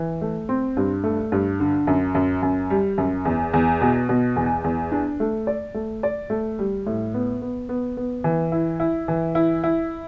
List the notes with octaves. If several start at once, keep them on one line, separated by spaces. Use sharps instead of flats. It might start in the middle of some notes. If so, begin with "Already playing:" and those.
Already playing: E3
A3
C4
G2
A3
G2
D3
F#2
F#2
F#2
G3
F#2
E2
E2
B2
B2
E2
E2
D4
A3
D5
A3
D5
A3
G3
A2
B3
B3
B3
B3
E3
E4
E4
E3
E4
E4